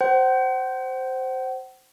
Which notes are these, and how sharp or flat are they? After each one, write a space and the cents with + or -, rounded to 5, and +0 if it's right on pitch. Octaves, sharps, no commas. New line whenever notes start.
C5 +0 F#5 +40